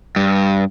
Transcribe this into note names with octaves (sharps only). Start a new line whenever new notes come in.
G2